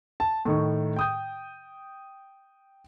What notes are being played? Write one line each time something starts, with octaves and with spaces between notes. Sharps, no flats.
A5
A2 D#3 C#6
G5 D#6 G6